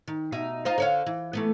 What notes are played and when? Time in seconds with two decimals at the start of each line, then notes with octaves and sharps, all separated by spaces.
0.08 D#3
0.32 B2 D#4 E5
0.65 D#4 F4 C5
0.78 D3 C#5 F5
1.06 E3
1.33 E3 A3 B3